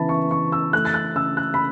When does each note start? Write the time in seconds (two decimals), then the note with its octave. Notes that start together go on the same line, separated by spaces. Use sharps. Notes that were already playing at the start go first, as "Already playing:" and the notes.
Already playing: C#3 E3 B3 A5 B5
0.09 C#6
0.30 E3 C#6
0.52 E6
0.73 A3 F#6
0.85 A6
0.94 F#6
1.15 C#3 E6
1.37 F#6
1.54 B5